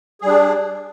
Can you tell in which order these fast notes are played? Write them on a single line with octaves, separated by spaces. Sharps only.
G#4 G3 D4